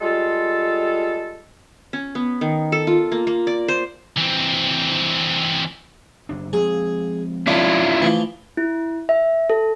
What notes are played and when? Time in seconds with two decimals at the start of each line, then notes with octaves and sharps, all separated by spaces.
0.01 G3 G#3 F4 A4
1.93 C#4
2.15 B3
2.41 D#3
2.72 A4
2.87 F4
3.12 A#3
3.27 A#3
3.47 D5
3.68 C5
4.17 E3 C4
6.29 F#1 D4
6.53 F3 G#3 C4 G#4
7.47 D3 C#4 E4 F4 D6
8.02 E3 F3 A3
8.57 E4
9.09 E5
9.50 A4